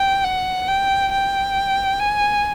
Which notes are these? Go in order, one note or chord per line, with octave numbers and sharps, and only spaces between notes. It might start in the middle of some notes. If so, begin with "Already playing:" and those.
Already playing: G5
F#5
G5
G5
G#5